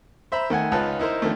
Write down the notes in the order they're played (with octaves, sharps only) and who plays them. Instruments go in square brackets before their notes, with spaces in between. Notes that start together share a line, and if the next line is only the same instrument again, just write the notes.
[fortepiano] C5 E5 A#5 B5
D#3 A3 F#5 G#5
C#2 D#4 F4 B4 A5
D#4 E4 A#4 C5
D3 D#3 F3 A3